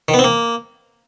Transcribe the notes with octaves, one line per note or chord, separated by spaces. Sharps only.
D#3
B3
C4
A#3